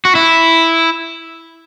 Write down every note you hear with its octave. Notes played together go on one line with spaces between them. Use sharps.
F#4
E4